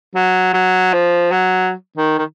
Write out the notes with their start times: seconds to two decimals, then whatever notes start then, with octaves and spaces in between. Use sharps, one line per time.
0.15 F#3
0.53 F#3
0.93 F3
1.31 F#3
1.97 D#3
2.18 D#3